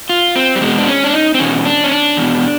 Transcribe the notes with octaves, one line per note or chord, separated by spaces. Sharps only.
F4
C4
G3
E2 B2 G#3
D4
C#4
D4
D#4
C4
E2 B2 C#4
D4
C#4
D4
E2 B2